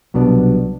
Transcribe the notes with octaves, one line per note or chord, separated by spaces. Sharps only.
C2 B2 F#3 B3 D4